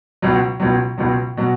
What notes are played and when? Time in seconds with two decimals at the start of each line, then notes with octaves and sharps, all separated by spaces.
0.22 C#2 B2 F#3
0.60 C#2 B2 F#3
0.98 C#2 B2 F#3
1.37 B2 F#3